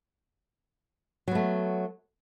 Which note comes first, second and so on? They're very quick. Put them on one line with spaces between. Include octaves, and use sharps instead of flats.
F#3 B3 A3